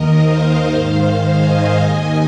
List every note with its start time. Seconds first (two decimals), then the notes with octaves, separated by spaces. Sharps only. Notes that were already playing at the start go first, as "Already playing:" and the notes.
Already playing: D#2 D#3 A#4 D#5
0.15 C5 F5
0.70 G#2 D#3
1.24 D#5 G#5
1.79 D#2 D#3